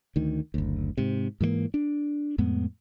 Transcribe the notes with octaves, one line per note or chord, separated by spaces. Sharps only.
D2 D#3
F#1 D2
G#2 C3
G#2 E3 G3 A#3
D4
F2 A2 G#3 B3